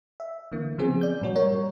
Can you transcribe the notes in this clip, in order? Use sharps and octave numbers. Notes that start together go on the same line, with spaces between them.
E5
D3 E3 A#3
C#3 F3 B3 C4 G#4
D5 G6
G2 A#2 C#4 F#4
G3 A#4 C#5